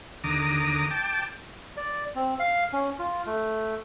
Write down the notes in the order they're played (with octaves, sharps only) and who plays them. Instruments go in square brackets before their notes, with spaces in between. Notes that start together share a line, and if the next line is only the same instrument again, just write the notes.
[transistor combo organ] D#2 D3 A#5 D6 D#6
G5 A5 D6
[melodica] D5
C4
F5
C#4
F4
A3